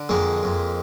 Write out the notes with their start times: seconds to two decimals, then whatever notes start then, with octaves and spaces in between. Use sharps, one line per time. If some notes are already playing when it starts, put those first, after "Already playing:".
Already playing: D3
0.09 F2 G#3 A#3
0.43 F2